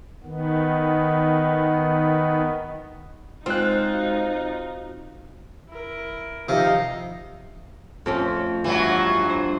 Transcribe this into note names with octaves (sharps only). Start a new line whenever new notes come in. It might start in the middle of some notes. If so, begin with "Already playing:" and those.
D#3 B3
G#3 C4 D#4 F4 F#6
F#4 F5
E4 A#4
C3 D#3 F3 D#4 F5 A#5
F2 A3 C4 C#4
G2 E3 F#3
C5